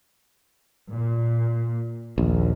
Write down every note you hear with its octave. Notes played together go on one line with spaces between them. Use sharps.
A#2
A#1 D#2